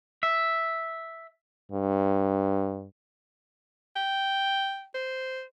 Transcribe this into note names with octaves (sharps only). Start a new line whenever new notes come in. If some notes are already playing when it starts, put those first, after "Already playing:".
E5
G2
G5
C5